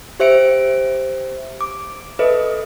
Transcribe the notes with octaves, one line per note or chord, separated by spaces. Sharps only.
G4 C5 E5 C#7 D7
D6
A4 B4 D#5 E5